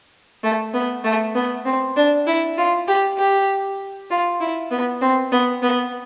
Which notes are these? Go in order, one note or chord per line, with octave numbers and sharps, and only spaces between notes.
A3
B3
A3
B3
C4
D4
E4
F4
G4
G4
F4
E4
B3
C4
B3
B3